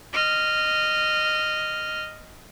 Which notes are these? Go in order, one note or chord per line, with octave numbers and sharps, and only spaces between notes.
D#5 F6